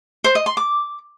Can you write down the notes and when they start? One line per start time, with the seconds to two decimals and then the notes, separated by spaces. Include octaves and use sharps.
0.24 C5
0.35 D#5
0.46 C6
0.57 D6